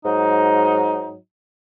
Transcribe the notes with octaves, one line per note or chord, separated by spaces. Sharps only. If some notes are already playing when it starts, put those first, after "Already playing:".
G#2 F#3 D#4